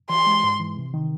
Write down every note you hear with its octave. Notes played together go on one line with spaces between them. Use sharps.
E3 C6
G#3
G#2
E3
C3
D#3